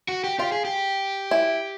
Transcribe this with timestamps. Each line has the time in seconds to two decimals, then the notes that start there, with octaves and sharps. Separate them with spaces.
0.08 F#4
0.24 G4
0.39 F4 G4
0.52 G#4
0.65 G4
1.31 E4